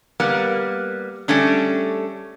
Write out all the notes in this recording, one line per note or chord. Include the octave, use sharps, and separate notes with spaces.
G3 A#3 B3
G3 A3 C#4 D4